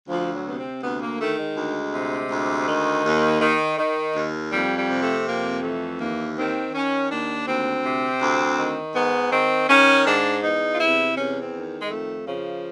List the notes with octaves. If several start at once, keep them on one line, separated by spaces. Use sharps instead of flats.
D2 F3
F#3
C3 B3
C4
D2 B3
A#3
D#3 A3
G#3
D2
C3
D2
D#3
D#2
D#3
D#3
D#2
F2 G3
G3
C3
A3
F2 A#3
E3 A3
D#2 A#3
D#3 C4
D#3 C#4
D#2 D4
D2 C4
C3
D2
D#3
G#2 B3
D#3 C4
D#3 C#4
G#2 D4
E2 D#4
F4
C3 E4
E2 C#4
C4
D#3
G#3
F2 A3
C#3 F3